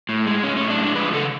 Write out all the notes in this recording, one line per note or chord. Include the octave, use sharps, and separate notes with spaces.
A2
G#3
A2 C#4
A2 C#4
D4
G#3
D4
F3 B4
C#3 A4